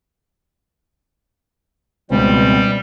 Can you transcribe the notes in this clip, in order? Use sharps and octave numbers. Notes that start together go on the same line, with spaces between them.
C#2 B2 E3 G3 C4